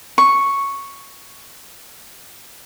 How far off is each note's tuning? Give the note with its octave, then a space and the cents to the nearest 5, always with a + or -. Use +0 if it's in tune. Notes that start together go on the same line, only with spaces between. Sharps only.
C#6 +0